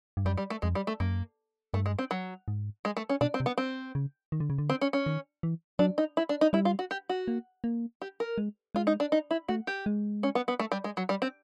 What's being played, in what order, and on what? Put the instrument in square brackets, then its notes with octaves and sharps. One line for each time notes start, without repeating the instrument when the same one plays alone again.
[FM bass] G2
[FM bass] F#2 [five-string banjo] G3
[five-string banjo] G3
A3
[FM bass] F2 [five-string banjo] G#3
[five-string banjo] G3
A3
[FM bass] F#2 [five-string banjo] A#3
[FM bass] G2 [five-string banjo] A3
[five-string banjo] G#3
C4
F#3
[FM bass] G#2
[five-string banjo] G#3
A3
C#4
[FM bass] B2 [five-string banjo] D4
[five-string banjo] C4
[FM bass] C3
[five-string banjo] B3
C4
[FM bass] C#3
D#3
D3
C#3
D3
[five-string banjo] C4
C#4
C#4
[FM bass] D#3
E3
[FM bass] F#3 [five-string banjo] D4
[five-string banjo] D#4
E4
D4
D#4
[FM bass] G3 [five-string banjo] E4
[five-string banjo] F4
F#4
G4
F#4
[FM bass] A#3
A#3
[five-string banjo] G4
A#4
[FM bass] G#3
[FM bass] G#3 [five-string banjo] F4
[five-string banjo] D#4
D4
D#4
E4
[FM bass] A3 [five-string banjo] F#4
[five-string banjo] G4
[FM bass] G#3
[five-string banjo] C#4
B3
B3
A3
G3
G#3
F#3
G3
C4